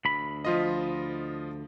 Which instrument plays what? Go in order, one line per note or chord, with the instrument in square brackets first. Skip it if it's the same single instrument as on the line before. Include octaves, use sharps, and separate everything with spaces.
[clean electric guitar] D2 B5
[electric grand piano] F3 F4 D#5